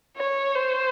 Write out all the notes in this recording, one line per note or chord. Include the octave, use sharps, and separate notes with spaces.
C#5
C5